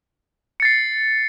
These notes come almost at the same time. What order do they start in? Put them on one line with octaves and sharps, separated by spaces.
C#7 A6 C7